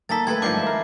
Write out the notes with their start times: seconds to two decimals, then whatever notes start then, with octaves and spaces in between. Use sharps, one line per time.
0.09 G3 A#3 D#4 A4 A6 B6
0.27 A3 G4 A4 B4 C6 G#6
0.42 G2 D3 D#3 F3 D6 G6 C7
0.54 G#3 B4 E5
0.67 A#4